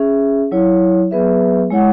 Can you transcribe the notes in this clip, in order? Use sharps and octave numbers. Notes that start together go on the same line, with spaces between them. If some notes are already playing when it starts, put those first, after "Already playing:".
Already playing: C#4 G#4 E5
F#3 E4 C#5
F#3 B3 G#4 B4 E5
G#3 E4 C#5 F#5